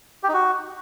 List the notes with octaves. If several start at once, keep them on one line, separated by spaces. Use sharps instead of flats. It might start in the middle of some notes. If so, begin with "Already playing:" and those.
G4
D#4
F#4